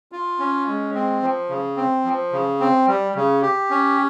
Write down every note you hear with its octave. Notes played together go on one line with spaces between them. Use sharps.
F4
C#4
G#3
C4
F3
C#3
C4
F3
C#3
C4
G3
C#3
G4
C#4